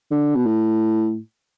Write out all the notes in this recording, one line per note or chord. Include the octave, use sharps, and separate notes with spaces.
D3
B2
A2